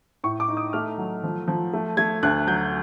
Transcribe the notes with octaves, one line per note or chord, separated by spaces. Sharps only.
A2 C#6
D6
D#4
D#6
A3 F6
F#3
F3
F3
A3
A3 G#6
D2 F#6
F#3 G6